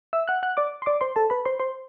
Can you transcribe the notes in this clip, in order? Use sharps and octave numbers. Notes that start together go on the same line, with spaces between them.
E5 E6
F#5 F#6
F#5 F#6
D5 D6
C6
D5 D6
C5 C6
A4 A5
B4 B5
C5 C6
C5 C6